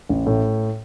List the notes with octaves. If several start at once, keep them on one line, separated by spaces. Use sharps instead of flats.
A1
A2